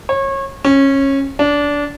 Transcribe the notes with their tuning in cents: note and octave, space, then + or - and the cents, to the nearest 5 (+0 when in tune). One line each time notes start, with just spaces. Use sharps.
C#5 -30
C#4 -20
D4 -20